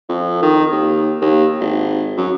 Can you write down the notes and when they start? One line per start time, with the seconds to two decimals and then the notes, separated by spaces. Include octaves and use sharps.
0.09 F2
0.42 D#3
0.72 D#2
1.21 D#2
1.60 G#1
2.17 F#2